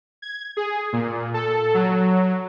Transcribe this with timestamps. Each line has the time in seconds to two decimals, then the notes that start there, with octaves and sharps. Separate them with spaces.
0.22 G#6
0.57 G#4
0.93 A#2
1.34 A4
1.74 F#3